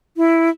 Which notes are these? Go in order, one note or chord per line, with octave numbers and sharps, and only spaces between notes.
E4